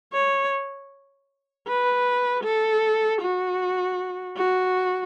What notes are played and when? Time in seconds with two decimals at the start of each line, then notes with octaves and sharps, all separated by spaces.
0.13 C#5
1.68 B4
2.44 A4
3.21 F#4
4.37 F#4